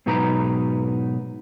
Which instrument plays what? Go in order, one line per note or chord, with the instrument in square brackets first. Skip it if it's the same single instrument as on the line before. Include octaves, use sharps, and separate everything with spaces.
[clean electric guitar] G#2 B2 F#3 D#4 B4 A#5